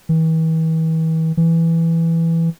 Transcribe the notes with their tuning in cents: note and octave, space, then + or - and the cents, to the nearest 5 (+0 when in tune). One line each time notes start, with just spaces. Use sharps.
E3 -40
E3 +5